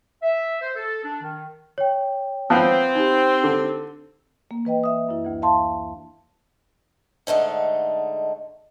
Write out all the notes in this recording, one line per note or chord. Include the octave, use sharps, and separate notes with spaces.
E5
C5
A4
D4
D#3
C#5 G5
F3 B3 C4 F#6
D#4 G4
D3
A#3
E3 B4 D#5 G5
E5 D#6
F#2 E4
D2 E3
E5 F5 A5 C6
G#2 D3 A3 D#4